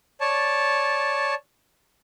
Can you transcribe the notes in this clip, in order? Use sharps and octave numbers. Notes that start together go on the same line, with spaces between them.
C#5 D5 A5